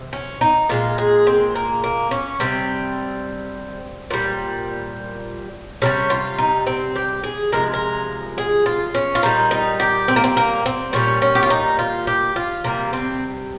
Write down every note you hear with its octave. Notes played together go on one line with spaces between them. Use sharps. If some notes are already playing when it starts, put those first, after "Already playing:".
Already playing: C3
C#4
D#4
A#2 G#3 F4
G#4
C4
A#3
A#3
C#4
C3 G3 C4
A#2 G3
C3 D#3 G3 C#4
F4
D#4
C4
G4
G#4
C3 F3 G#3 A#4
A#4
G#4
F4
C#4
F4
A#2 G3 D#4
D#4
G4
C4
A#3
C4
A#3
C4
A#2 G3 C#4
C#4
G4
F4
D#4
F4
G4
F4
C3 G3 A#3
C4